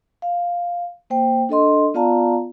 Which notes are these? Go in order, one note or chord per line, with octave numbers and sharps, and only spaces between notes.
F5
A#3 C5 G5
D4 A4 D#5 C6
B3 F4 D5 F5 A5 A#5